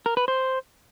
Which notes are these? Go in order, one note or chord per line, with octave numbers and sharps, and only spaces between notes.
A#4
B4
C5